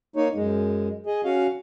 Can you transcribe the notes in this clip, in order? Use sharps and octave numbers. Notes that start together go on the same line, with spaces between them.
A#3 D#4 C#5
F#2 G#3
G#4 D#5
C#4 F#4 F5